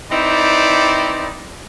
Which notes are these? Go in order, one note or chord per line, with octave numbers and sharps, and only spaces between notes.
C4 D#4 E4 B4 D5